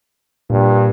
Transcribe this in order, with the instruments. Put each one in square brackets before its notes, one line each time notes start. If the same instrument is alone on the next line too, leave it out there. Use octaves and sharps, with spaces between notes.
[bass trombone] G2 [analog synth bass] A#2